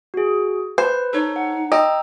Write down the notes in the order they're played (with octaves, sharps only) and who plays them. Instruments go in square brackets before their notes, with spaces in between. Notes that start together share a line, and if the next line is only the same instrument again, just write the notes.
[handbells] F#4 G#4
[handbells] B4 [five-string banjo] C5
[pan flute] D#4 [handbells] A4 C#5
[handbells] F#5
[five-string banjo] D#5 [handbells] G5 A#5 E6